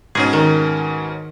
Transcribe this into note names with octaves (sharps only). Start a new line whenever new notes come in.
G#2 B2 C#4 G#4
D#3